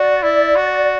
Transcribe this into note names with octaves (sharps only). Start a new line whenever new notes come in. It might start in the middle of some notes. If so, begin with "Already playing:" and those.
Already playing: F#4 D5
E4
F#4